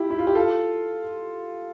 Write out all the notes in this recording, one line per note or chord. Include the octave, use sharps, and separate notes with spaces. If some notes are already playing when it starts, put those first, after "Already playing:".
Already playing: E4 F4 G4
E4
F4
G4
F4 A4